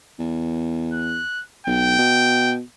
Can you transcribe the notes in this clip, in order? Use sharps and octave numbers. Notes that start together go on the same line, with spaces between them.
E2
F#6
B1 G5
B2